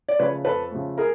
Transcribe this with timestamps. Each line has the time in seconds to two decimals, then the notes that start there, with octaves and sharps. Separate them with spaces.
0.08 D5
0.19 C#3 F3 A3 B4 C#5
0.45 F2 A4 B4
0.71 C#3 F3 A3
0.98 G#4 A#4